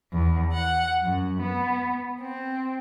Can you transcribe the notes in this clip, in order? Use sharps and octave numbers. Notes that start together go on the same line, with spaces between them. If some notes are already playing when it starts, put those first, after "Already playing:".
E2
F#5
F#2
B3
C4